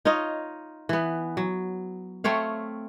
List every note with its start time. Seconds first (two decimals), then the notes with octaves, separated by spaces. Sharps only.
0.05 D#4 F4 C#5 D#5
0.89 E3 B3
1.37 F#3
2.24 A3 C4 C#5 F5